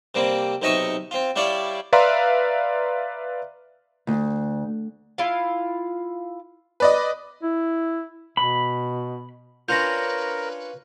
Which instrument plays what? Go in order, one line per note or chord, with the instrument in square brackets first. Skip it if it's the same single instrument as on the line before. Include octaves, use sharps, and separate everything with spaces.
[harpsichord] C3 G3 A#3 C4
B1 C3 D#4 D#5 E5 C#6
C4 F4
G3 E4 G4 C#5 D5 F5
[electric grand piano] B4 D5 E5 F5 A#5 C6
[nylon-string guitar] D2
[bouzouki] E4 F4 F5
[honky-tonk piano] B4 D5 D#5
[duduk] E4
[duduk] B2 [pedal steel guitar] B5
[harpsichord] C#4 D4 F4 [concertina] A#4 [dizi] B4 [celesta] G6 A#6